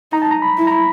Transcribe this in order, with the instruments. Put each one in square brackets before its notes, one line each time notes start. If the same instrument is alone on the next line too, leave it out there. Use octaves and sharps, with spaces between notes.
[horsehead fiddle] D#4 [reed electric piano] A#5
[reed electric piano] A5
A#5
B5
[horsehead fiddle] E4
[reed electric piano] A#5
B5